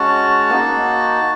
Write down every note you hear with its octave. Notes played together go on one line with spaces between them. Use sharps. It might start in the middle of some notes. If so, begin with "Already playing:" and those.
Already playing: G#3 C#4 F#4 A5
A#3 D#4 F#4